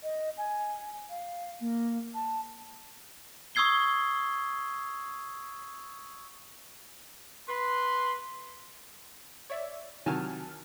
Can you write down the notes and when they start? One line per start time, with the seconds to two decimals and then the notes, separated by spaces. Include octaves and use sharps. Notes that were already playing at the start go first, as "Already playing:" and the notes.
0.03 D#5
0.38 G#5
1.10 F5
1.61 A#3
2.15 A5
3.55 C#6 D#6 E6 G#6 C7 G7
7.49 B4 C6
9.50 C#5 D5 E5
10.06 C3 D#3 F#3 G#5 A5 F6